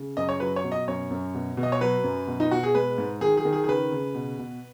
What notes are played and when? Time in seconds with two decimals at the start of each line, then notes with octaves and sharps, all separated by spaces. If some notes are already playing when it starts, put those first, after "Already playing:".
Already playing: C#3
0.17 F#2 D#5
0.29 C#5
0.40 F#3 B4
0.56 C#5
0.64 B2
0.72 D#5
0.88 F#2 C#5
1.11 F#2
1.34 B2
1.57 B2
1.63 D#5
1.72 C#5
1.81 F#3 B4
2.04 F#2
2.27 B2
2.40 D#4
2.51 B2 F#4
2.63 G#4
2.75 G#3 B4
2.98 G#2
3.21 D#3 G#4
3.37 G#4
3.45 D#3
3.53 G#4
3.64 G#4
3.68 C#3 B4
3.92 C#3
4.15 B2
4.38 B2